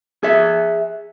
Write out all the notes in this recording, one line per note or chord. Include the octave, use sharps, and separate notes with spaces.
G#4 E5